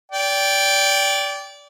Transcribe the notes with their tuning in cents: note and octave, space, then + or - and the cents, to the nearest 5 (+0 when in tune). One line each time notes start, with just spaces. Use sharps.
D5 -25 G5 +0